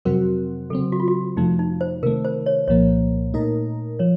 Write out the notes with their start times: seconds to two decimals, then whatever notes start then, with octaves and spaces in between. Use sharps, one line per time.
0.05 F2 C3 F#3 C4 F#4 A#4
0.70 C#3 F#3 C4 A4
0.92 F#4
1.00 F4
1.08 F#4
1.37 F2 C3 F3 A3 D#4
1.59 D#4
1.81 C5
2.03 C3 D#3 A3 A#4
2.25 C5
2.46 C#5
2.68 C2 A#2 F3 A#3 C#5
3.34 A#2 A3 D#4 A#4
3.99 F3 C#5